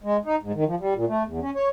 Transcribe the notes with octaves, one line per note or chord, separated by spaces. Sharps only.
G#3
D#4
G#2
D#3
F3
G3
A#2
A3
E2
C#4
C#5